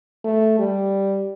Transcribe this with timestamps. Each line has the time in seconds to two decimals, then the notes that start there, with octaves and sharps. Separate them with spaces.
0.25 A3
0.59 G3